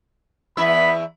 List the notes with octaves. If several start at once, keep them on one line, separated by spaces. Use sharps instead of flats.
E2 B3 E4 E5 B5